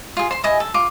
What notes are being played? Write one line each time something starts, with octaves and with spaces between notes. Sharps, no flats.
F4 G#4
C5 C6
E4 D#5 G#5
A4
F4 D6